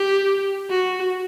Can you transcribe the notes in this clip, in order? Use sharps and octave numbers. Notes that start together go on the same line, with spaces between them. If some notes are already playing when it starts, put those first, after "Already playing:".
Already playing: G4
F#4